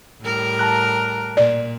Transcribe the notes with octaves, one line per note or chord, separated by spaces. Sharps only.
A2 G3 A#4
A5 A#5 F#6
A#2 D5